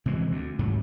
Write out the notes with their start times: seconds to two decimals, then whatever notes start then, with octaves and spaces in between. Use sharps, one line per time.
0.06 C3 E3 F3 G#3
0.32 D2
0.59 G#2 C3 D#3 F#3